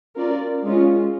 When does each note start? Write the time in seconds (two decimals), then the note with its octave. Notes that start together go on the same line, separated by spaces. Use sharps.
0.16 C#4 F4 A#4 D5
0.64 G#3 C#4 F4